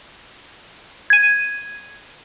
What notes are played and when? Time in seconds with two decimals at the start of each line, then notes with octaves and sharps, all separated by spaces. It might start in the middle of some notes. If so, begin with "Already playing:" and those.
1.10 G#6 D#7